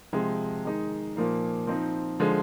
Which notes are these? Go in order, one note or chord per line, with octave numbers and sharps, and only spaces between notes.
C3 F3 G#3
D#3 G#3 D#4
A#2 F3 A#3 D#4
F3 C4 D#4
D3 F3 G#3